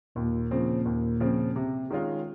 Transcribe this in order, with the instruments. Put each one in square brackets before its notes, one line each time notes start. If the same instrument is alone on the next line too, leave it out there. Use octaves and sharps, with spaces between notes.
[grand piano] D#2 [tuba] A#2
[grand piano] C#3 F3 C4
D#2
C#3 F3 C4
C3
D#3 G#3 C#4 F4